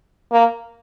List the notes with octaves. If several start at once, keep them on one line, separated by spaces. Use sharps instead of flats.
A#3